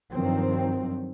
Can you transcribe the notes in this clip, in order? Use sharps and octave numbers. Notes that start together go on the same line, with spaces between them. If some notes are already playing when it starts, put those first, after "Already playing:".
G2 D#3 F3 F#3 C4